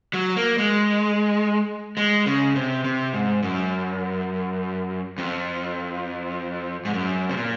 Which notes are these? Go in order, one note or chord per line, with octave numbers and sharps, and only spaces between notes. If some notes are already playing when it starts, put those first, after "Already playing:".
F#3
A#3
G#3
G#3
C#3
C3
C3
G#2
F#2
F2
G#2
F#2
C3
A#2